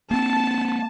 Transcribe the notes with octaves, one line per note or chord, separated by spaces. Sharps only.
A#3 C4 A5